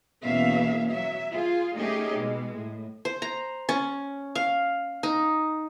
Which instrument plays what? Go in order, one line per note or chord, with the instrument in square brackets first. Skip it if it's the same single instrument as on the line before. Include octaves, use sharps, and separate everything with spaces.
[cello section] E2 B2 A#3 C#4 E5 F5
F#3 E5
F4 G#4
A3 C#4 D#4 G4 G#4
B2 G#3
A2
[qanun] C5
A#5
C#4
F5
D#4